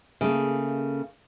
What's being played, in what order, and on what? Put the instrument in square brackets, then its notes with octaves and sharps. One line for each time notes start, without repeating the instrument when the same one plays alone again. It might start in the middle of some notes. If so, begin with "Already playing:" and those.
[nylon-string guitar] C#3 A3 A#3